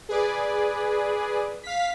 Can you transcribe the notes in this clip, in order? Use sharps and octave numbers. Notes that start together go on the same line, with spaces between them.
G#4 B4 D5
F5 B6